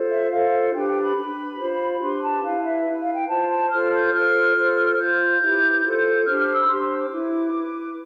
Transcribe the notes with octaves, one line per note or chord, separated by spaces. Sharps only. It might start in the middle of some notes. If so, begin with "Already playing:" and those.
Already playing: F4 A4 C5
E5
F4 A4 C5 F5
D4 G4 B4 G5
G5
B5
D4 G4 B4
F4 C5
D4 G4 B4 C6
A5
E4 B4 F5
E5
E4 B4
F5
G5
F4 C5 A5
A5
F4 A4 C5 F6
G6
F4 A4 C5 F6
F4 A4 C5
F4 G6
C5
E4 G4 B4
F4 A4 C5
D4 G4 C5 F6
F6
E6
B5
D4 G4 C5 C6
C6
D6
E4 B4
E4 B4